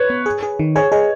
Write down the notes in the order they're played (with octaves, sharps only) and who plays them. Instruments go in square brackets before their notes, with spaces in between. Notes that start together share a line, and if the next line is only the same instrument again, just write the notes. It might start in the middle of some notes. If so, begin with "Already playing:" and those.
Already playing: [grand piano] B4 C#5
[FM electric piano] B3
G#4
G#4
D#3
[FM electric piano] G#4 [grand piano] C#5
[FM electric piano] G#4 [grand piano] D#5